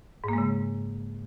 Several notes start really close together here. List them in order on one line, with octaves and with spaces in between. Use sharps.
G#2 A#3 G#3 C#3